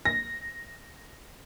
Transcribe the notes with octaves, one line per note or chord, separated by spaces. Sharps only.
A#6